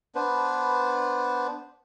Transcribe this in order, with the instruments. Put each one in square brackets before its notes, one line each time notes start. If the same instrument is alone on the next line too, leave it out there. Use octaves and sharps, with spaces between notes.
[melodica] B3 D4 B4 C5